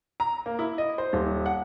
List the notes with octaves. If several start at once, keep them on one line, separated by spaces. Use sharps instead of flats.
A#5
A#3
E4
D#5
C5
D#1
F#5